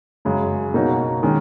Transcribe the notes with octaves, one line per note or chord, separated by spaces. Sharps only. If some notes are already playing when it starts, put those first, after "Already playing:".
F#2 C#3 G#3
B2 A#3 D#4 F#4 C#5
D#3 G#3 C#4